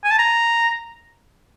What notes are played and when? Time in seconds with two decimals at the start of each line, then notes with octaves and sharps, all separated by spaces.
0.04 G#5
0.11 A5
0.19 A#5